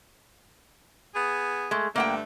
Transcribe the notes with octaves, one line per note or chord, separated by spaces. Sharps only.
B3 G#4
G#3 A3
G2 D3 A3 A#3 F#5 G5